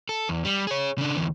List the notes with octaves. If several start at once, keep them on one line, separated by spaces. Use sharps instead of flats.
A4
E2
G3
G#4 C#5
C#3 D4
D2 E3